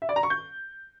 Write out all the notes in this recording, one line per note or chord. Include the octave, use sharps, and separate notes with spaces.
E5
D5
A#5
C#6
G6